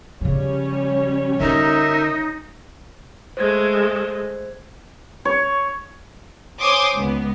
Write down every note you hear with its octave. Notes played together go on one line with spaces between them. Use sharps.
C#3 F3 G3 C#4 C#5
D3 D#4 A#4 E5
G#3 A3 C5 G#6
C#5
C5 C#5 G#5 C6 D6 D#6
C#2 B3